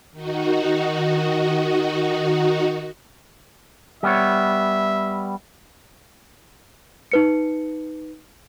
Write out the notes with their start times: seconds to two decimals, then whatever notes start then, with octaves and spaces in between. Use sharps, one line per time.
0.12 D#3 D#4 F#4
4.03 G3 B3 C#5 E5
7.12 D#4 B4 C#7